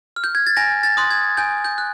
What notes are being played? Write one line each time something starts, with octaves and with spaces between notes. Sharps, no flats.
F6
G6
G#6
A6
G#5 A#6
A6
C6 D#6 F#6
G#6
G#5 G6
G6
F#6